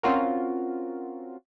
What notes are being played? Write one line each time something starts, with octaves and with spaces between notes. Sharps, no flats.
C4 C#4 F4 F#4 A#4